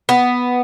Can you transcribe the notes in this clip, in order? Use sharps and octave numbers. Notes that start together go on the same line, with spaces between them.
B3